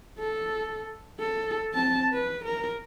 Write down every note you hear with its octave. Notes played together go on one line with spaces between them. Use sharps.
A4
A4
C4 A5
B4
A#4